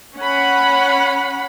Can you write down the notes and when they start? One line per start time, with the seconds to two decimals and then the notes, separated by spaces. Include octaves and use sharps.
0.18 C#4 F#5 B5